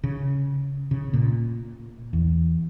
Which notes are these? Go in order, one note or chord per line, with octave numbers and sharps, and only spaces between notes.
C#3
C#3
A#2
E2